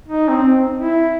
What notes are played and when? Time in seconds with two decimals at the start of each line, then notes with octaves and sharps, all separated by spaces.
0.08 D#4
0.28 C4
0.79 E4